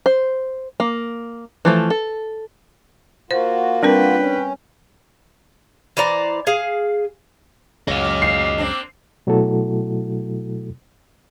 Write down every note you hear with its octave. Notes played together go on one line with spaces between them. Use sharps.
C5
A#3
E3 F3 A3
A4
A#3 F4 F#4 C5
G3 C4 D4 A#4 B4 G5
C#4
E3 C5 D5 A#5
G#4 F5
C#2 F#2 A#2 C#3 F#3 D#5 F5
C7
A#3 C4 D4
B2 F#3 A3 E4 F#4 A4